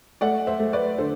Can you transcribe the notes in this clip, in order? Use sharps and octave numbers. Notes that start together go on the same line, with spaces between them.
A3 D5 F#5
C5 E5
A3
B4 D5
D3 A4 C5